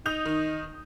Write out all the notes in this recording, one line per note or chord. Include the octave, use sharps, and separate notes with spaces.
D#4 D#6 G6 F7
D#3